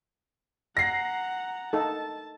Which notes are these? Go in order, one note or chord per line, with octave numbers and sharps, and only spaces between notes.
F#5 A#5 A#6 C7
D#4 A4 A5